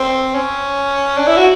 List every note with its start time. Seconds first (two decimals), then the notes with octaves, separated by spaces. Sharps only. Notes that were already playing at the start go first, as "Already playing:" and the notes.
Already playing: C4
0.35 C#4
1.17 D4
1.27 E4
1.37 F#4